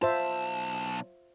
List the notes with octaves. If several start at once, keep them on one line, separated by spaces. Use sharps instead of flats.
B1 F4 C5 E5 A5